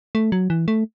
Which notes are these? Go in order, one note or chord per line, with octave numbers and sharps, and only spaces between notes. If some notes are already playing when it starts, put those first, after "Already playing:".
A3
F#3
E3
A3